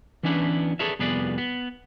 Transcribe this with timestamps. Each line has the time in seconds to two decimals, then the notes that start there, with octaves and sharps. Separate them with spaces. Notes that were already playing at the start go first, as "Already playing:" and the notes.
0.23 E3 B3 C#4 D4 E4 B4
0.79 G#4 A4 B4 C#5 D5 E5
0.99 C2 F2 B3 G#4 B4 D5
1.38 B3